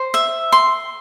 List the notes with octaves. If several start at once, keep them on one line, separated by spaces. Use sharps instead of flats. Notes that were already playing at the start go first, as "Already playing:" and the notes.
Already playing: C5
E5
C6